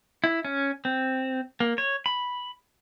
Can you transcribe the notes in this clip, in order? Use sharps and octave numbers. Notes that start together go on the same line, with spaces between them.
E4
C#4
C4
A#3
C#5
B5